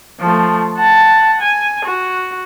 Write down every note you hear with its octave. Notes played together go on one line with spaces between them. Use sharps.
F3 A3
F#5 A5
G#5
F#4